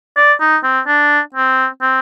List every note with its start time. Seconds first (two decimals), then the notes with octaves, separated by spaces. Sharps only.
0.17 D5
0.40 D#4
0.64 C4
0.87 D4
1.34 C4
1.81 C4